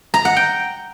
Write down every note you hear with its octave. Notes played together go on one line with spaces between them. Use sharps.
A#5
F#5
G5